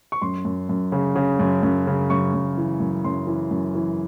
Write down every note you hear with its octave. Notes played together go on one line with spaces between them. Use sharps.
C#6
F#2 C6
F#2
F#2
C#3
C#3
F#2
F#2
C#3
F#2 C#6
F#2
E3
F#2
F#2 C6
E3
F#2
E3